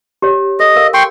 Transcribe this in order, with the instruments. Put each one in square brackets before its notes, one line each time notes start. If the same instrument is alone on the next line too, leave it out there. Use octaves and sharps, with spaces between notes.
[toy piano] G4 C#5
[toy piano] A4 [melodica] D#5
[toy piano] A#4 F5
[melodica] G5 C6 C#6